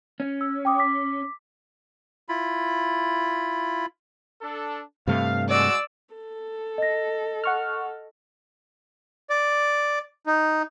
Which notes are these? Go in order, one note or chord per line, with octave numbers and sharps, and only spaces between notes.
C#4
E6
G5 D6 D#6
D6 B6
E4 F4 B5
D4 A4
G2 C3 A3 F5
G#3 F#4 D5 E6
A4
D#5 A#6
F#5 C#6 F6
D5
D#4